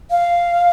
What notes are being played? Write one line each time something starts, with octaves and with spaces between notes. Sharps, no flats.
F5